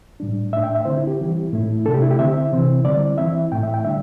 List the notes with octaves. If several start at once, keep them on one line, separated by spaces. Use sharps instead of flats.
A2 G3 D4
A2 A3 D4 E5
G5
E5
D3 C4 E4 C5
E4
G4
E3 G3 C4 E4
A2 A3 E4
C3 A3 D4 A4
G4
E4
G4
D3 C4 E4 E5
C3 E3 C4 E4
D3 G3 C4 E4 D5
E3 C4 E4 E5
A2 A3 E4 G5
E5
G5
D3 G3 D4 E5